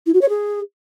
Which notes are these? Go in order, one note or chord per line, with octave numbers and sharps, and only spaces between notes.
E4
F#4
C#5
G#4